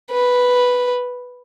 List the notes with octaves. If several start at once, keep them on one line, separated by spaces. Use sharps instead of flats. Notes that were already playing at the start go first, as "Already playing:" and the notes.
B4